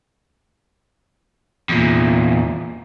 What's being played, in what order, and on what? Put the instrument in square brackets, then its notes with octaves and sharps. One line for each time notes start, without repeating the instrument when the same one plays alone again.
[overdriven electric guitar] E2 A#2